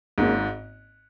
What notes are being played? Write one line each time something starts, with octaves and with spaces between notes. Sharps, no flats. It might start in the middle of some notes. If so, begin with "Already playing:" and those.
G#1 G#2 A#3 C#4 G#4